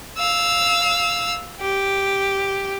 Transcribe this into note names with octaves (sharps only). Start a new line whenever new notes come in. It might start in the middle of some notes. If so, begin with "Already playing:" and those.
F5 E6
G4